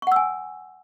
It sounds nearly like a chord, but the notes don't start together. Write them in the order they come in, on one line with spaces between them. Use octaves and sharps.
C#6 F#5 E6 G#5